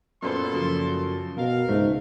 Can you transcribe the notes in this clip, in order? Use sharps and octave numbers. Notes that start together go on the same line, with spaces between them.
F#2 A#2 B3 A4 C5 C6
F#2 C#3 F3
B2 A#4 F5
C#2 G#2 A3